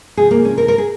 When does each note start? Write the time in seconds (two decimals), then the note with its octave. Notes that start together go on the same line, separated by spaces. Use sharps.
0.17 C3 F3 G#4
0.31 A#3
0.45 C#4
0.58 A#4
0.68 A#4
0.78 G#4